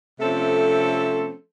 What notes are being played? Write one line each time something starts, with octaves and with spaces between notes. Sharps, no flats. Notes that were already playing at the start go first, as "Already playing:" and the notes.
C3 F3 A3 C4 C#4 A4